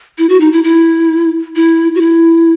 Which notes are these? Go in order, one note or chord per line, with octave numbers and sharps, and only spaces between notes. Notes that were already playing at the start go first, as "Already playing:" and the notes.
E4
F#4
D#4
E4
E4
E4
F#4
E4